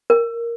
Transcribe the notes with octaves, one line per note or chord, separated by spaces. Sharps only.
A#4